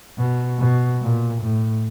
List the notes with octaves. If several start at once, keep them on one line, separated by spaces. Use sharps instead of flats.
B2
B2
A#2
A2